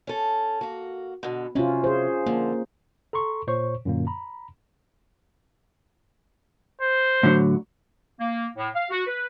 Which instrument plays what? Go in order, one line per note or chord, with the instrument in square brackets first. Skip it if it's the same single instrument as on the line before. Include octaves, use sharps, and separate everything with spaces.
[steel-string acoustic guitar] C#4 A4
A#3 F#4
B2 D3
[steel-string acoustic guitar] C3 F#3 [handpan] C#4 F4
[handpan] G#4 C5
[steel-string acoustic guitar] D3 F3 [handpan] A#3
[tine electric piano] A4 A#5 C6 C#6
A#2 C5 C#5 C#6
F#2 A#2 D3 A#3
A#5 B5
[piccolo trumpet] C5
[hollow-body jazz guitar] A2 D3 F#3
[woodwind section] A#3
A2
F5
F#4
B4